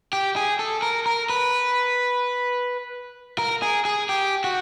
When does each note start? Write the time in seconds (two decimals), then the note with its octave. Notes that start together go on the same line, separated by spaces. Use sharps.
0.13 G4
0.36 G#4
0.59 A4
0.82 A#4
1.06 A#4
1.30 B4
3.38 A#4
3.62 G#4
3.85 G#4
4.09 G4
4.44 F#4